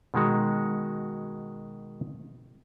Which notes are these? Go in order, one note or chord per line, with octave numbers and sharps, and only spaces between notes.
B2 D#3 G#3 F#4